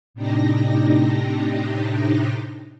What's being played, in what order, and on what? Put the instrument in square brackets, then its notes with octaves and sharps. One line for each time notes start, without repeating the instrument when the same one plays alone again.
[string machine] A2 C3 D4 D#4 G4 A#6